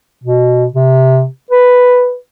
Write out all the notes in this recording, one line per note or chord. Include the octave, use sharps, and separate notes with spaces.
B2
C3
B4